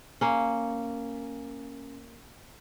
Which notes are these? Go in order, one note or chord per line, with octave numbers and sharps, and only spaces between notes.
A#3 C#4